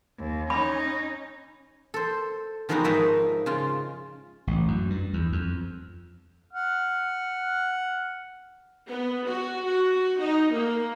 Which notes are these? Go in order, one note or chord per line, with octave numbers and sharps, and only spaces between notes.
D#2
C#4 D#4 B5
A4 C5
D#3 F3 G#3 B3 D#4 F#4
G#2 F3 D#4 A#4 E5 G#5
C#3 F4 C6
A1
F#2
G2
E2
F2
F#5 F6
B3
F#4
F#4
D#4
A#3